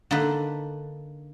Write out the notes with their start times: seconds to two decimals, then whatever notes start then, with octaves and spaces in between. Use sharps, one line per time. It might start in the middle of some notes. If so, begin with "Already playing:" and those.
0.11 D3 A#3 D#4 B4